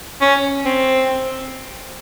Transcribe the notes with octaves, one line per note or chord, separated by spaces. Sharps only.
C#4
C4